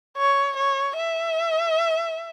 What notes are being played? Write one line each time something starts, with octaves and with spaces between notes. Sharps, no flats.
C#5
C#5
E5